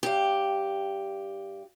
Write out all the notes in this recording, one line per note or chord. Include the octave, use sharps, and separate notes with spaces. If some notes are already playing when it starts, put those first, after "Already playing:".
G2 G4